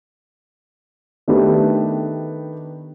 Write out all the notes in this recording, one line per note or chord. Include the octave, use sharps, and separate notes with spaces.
D#3 A3 B3 D4 G4 B4